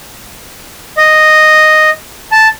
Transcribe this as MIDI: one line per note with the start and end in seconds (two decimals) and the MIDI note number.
0.97 1.90 75
2.32 2.48 81